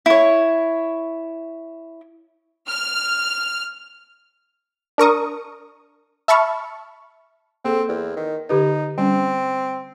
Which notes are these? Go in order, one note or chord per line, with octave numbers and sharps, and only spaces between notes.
E4 C#5
F6
D4 A#4 C#6 D#6
E5 A5 B5 C#6 F6
A#3 C4 G#4 A4
E2
D#3
D3 D#4 G4 B4
G3 C4 C#4